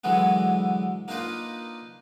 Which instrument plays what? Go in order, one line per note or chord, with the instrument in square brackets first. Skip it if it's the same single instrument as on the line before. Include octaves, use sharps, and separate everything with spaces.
[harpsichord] D3 E3 F#3 G#3 B3
A#3 D4 D#4 F4 A#4 B4